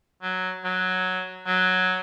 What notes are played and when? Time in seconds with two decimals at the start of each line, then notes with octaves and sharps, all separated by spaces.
0.22 F#3
0.65 F#3
1.47 F#3